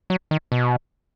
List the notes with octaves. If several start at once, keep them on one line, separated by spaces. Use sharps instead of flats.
F#3
D#3
B2